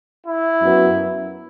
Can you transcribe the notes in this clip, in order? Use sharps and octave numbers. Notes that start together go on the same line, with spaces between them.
E4
F#2 F#3 B3